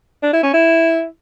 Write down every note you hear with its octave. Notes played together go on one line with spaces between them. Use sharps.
D4
E4
C#4
E4